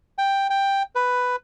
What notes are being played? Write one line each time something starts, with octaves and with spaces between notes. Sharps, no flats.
G5
G5
B4